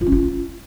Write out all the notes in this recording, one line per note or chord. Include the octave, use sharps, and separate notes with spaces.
F4
C#4
F4